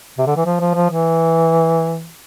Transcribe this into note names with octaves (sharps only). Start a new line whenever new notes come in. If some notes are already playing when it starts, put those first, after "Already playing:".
C3
D3
E3
F3
F3
F3
E3